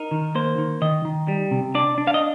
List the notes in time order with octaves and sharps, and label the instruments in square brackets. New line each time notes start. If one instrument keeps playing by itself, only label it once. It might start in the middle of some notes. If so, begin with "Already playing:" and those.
Already playing: [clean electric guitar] D#4 A#4
D#3
A#3 C5
D#3
D#3 D#5
D#3
G3
C3
D4 D5
D4
F5
D#5